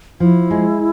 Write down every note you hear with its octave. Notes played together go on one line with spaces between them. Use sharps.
F3 E4
G#3